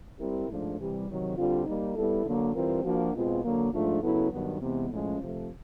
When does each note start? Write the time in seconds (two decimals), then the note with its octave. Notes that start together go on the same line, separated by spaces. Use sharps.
0.19 G3 C4 E4 G4 A#4
0.48 G#2 F3 A3 D4
0.78 C3 E3 G3
1.08 C3 D#3 F#3
1.37 D3 G3 C4 F4
1.66 G3 A#3 D#4
1.95 G3 B3 E4 A4
2.25 D3 F#3 A#3
2.54 E3 G3 C4 F4 A#4
2.84 F3 A#3 D4 F#4
3.14 B2 G#3 C4 F4
3.43 D3 F#3 A#3
3.72 G#2 F3 A3 D4 F4
4.01 C#3 F#3 B3 E4 A4
4.31 G2 D#3 F#3 B3
4.60 C3 E3 G#3 B3
4.90 A2 F3 G#3 C#4
5.20 C3 F3 A3